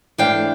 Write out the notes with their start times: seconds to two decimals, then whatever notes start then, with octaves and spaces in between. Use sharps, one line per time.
0.18 G#2 E3 A3 D4 F5 G5